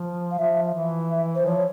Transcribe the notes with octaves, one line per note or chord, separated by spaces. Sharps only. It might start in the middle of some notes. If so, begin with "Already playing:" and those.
Already playing: F3
F5
F3 E5
E3
E5
C5
F3 C#5